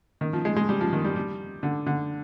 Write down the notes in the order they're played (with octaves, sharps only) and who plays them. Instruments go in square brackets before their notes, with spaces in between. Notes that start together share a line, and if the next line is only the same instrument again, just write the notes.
[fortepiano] D#3
F3
G#3
G#3
G3
F3
D#3
G3
G3
D3
D3